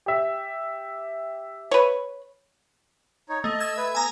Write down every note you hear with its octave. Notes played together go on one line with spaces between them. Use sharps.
G4 E5
B4 C#5
D#4 C#5
A3 D#5
E6 G#6
B4 E5
B3 G#5 A#5